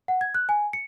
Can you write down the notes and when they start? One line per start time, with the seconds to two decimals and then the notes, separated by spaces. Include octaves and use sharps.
0.08 F#5
0.21 G#6
0.34 F#6
0.49 G#5
0.73 C#7